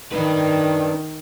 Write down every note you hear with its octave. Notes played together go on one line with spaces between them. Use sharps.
D#3 D4 B4